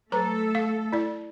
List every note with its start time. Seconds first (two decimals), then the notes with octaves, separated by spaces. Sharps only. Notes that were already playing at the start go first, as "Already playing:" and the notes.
0.12 F#3 A3 A4 B4 A#5
0.55 F5
0.92 E4 D5